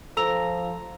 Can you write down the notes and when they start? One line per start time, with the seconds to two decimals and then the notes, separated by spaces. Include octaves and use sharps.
0.17 F3 A4 A#5 E6 F7